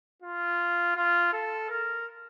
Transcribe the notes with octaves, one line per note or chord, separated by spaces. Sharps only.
F4
F4
A4
A#4